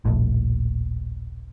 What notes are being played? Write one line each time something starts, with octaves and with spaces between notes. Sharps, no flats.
D#1 A#1 A2